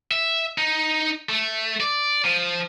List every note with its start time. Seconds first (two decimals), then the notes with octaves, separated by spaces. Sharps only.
0.11 E5
0.58 D#4
1.29 A3
1.80 D5
2.25 F3